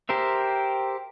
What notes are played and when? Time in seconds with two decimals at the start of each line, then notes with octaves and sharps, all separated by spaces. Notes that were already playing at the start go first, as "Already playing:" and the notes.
0.09 G4 A#4 C5 E5